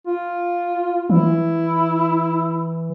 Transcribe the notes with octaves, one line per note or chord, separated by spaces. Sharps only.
F4
E3 E4